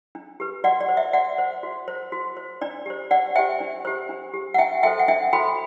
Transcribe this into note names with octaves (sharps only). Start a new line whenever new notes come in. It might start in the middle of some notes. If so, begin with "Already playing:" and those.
D4
G4 B4
F#4 D5 F#5
D5
C5
E5
F#4 D5 F#5
C5
F#4
C5
F#4
C5
D4 D5
G4 C5
D4 D5 F#5
G4 C5 E5 G5
D4
G4 C5
D4
G4 C5
F#5
D4 E5 G5
F#4 A4 C5 E5 G5
F#5
D4 E5 G5
F#4 A4 C5 G5 B5